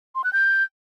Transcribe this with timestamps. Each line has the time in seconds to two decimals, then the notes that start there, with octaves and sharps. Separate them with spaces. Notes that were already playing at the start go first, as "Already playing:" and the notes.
0.15 C6
0.24 F#6
0.33 G6